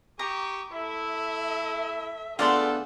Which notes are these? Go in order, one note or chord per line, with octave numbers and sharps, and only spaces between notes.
G4 A#5 C#6 D#6
A3 E4 E5
D3 A3 B3 F4 G#4 A4 D5 C6